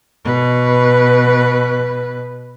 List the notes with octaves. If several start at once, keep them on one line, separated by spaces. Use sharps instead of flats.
B2 B4